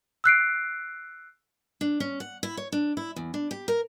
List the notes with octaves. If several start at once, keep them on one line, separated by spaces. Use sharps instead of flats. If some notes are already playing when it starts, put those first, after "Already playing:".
E6 F#6 C7 D7
D4
C#4
F#5
E4
C#5
D4
E4
E2
D4
G4
A#4